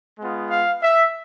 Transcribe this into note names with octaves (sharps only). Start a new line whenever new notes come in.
G#3 B3 F4
F5
E5